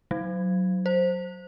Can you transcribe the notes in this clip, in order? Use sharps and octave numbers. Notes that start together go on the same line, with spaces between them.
F#3
C5